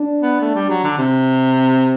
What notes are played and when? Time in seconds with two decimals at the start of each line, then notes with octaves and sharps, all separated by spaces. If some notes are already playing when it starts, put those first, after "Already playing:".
Already playing: D4
0.22 B3
0.41 A3
0.55 G3
0.70 F#3
0.84 D3
0.98 C3
1.56 C4